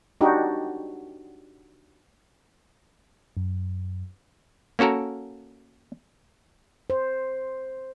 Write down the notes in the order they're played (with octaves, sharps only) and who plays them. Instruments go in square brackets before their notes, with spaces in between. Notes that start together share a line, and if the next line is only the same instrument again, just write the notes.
[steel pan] D4 D#4 F#4 G4
[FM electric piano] F#2
[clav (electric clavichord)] A#3 C#4 F#4 A4 A#4
[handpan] C5